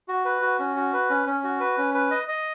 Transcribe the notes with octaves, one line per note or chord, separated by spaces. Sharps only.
F#4
B4
F#4
C#4
F#4
B4
C#4
C#4
F#4
B4
C#4
B4
D#5
D#5